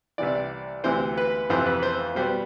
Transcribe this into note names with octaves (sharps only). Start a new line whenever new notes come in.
C2 C3 E3 D5
D2 C3 E3 C5
B4
F2 C3 E3 C5
B4
C5
B2 G3 B3 C5